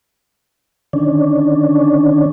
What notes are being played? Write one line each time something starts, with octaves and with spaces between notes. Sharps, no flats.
D3 D#3 C#4 D4